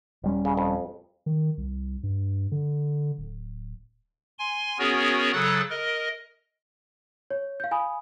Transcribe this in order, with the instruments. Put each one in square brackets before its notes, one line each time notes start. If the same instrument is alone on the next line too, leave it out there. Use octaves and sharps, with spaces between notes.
[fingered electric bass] D#1 G3 C#4
[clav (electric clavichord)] C#3
F2
[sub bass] D#3
C2
G2
D3
D1
[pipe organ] G#5 C6
B3 C#4 F#4 G#4 A#4 C#5
C#3 F#3 A4 D#6 F#6 A6
A#4 D#5
[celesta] C#5
F5 G6
F5 G#5 B5 D#6